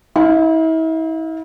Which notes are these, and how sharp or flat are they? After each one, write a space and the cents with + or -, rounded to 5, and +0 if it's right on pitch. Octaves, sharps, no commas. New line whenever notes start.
E4 -40 F5 +5